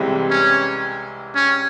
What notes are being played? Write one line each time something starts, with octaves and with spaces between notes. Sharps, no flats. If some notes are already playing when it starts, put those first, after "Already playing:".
Already playing: C2 C3 E3 G#3 C4
C#4
C#4